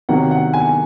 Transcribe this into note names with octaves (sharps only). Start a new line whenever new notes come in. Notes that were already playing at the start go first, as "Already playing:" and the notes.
C3 D#3 F#3 A#3 F#5
F#5
G#5